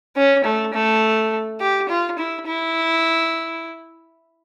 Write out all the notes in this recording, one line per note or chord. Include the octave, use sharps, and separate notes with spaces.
C#4
A3
A3
G4
F4
E4
E4